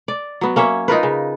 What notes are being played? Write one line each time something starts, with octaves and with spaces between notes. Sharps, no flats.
D5
F#3 B3
A#3 C#4 C#5 E5
D#4 F4 A#4 B4
C#3